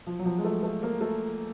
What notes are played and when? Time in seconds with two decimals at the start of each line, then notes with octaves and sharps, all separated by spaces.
0.07 F3
0.19 F#3
0.26 F3
0.38 G#3
0.44 A3
0.63 A3
0.83 A#3
1.01 A3